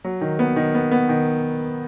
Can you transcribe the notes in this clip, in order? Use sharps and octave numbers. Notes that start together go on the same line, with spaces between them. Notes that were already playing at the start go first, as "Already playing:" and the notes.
F#3
D#3
B3
D#3
B3
B3
D#3